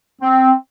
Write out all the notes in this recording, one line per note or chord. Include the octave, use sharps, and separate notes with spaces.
C4